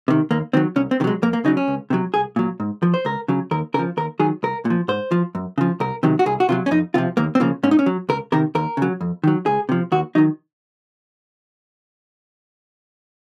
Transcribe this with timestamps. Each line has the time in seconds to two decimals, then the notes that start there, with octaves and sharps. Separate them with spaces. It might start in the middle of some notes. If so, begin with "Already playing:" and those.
0.08 C3 D#3
0.31 D#2 A#3
0.53 D#3 F#3 C4
0.76 C2 C#4
0.91 C4
1.00 C3 D#3
1.04 F#3 G#3
1.22 F2 A#3
1.33 A#3
1.45 C#3 F#3 D#4
1.57 C#4
1.68 C#2
1.90 C3 D#3 F#3
2.14 C2 G#4
2.36 A#2 F#3
2.60 G#2
2.83 F3
2.94 C5
3.05 C#2 A#4
3.28 C#3 F#3
3.51 D#2 A#4
3.74 C#3 A#4
3.79 F3
3.97 D#2 A#4
4.20 D#3 F#3 G#4
4.43 C2 A#4
4.65 A#2
4.70 F3
4.88 G#2 C5
5.11 F3
5.35 F#2
5.58 C#3 F3
5.80 C2 A#4
6.03 C3 D#3 F#3
6.19 F#4
6.26 C2 G#4
6.40 F#4
6.49 C3 D#3 F#3 F4
6.66 C#4
6.71 F2 D#4
6.94 C3 F3 F4
7.17 D#2 A#3
7.35 C4
7.40 C#3 F3 A#3
7.63 G#2 C#4
7.71 D#4
7.79 C#4
7.86 F#3
8.09 C#2 A#4
8.32 C3 D#3 A#4
8.55 D#2 A#4
8.77 C#3 F#3
9.01 F2
9.24 D#3 F#3
9.46 C#2 G#4
9.69 C3 F3
9.92 D#2 F#4
10.15 D#3 F#3 D#4